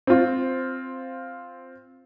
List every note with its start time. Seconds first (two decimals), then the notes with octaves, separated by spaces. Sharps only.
0.07 C4 F4